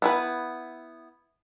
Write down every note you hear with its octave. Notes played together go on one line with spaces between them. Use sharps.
B3 E4 B4